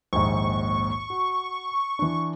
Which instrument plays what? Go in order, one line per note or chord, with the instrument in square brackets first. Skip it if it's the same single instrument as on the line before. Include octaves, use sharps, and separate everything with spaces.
[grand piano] A#1 D#2 G#2 [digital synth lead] C#6
[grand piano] F#4
E3 D4